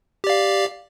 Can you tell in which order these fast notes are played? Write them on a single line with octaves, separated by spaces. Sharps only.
G4 D5 F5